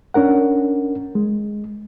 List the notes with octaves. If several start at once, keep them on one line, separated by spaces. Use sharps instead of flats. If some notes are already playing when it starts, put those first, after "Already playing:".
C#4 D4 A#4 F#5
G#3